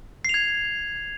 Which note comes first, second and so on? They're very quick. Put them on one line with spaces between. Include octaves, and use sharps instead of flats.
C7 F7 G#6